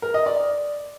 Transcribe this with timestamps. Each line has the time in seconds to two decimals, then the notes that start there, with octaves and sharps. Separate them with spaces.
0.02 A#4
0.14 D#5
0.26 D5